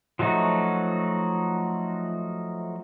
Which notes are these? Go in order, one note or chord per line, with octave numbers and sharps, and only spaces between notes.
F3 F#3 A3 D#4 F#4